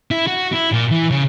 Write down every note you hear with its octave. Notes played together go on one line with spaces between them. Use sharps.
E4
F#4
E4
A#2
E3
C#3